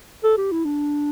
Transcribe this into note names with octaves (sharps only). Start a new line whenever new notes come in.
A4
G4
E4
D4